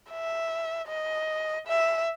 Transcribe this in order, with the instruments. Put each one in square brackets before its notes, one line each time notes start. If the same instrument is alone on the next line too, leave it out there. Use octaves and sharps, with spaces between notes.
[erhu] E5
D#5
E5